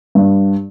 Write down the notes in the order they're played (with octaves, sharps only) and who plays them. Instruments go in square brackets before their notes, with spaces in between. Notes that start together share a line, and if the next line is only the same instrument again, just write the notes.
[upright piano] G2